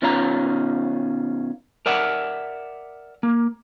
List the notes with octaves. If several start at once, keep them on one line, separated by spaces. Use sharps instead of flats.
B2 D#3 C#4 E4 F4 A#5
A#4 D5 E5 F#5
A#3